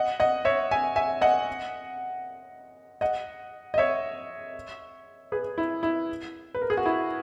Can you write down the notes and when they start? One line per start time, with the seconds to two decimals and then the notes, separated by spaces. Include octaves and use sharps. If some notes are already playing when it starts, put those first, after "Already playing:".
Already playing: D#5 F#5
0.20 D#5 F#5
0.45 C#5 E5
0.71 E5 G#5
0.96 E5 G#5
1.21 D#5 F#5
3.01 D#5 F#5
3.74 D#5
3.78 C#5 E5
5.32 G#4 B4
5.58 E4
5.83 E4
6.55 B4
6.62 A#4
6.70 G#4
6.77 F#4
6.86 E4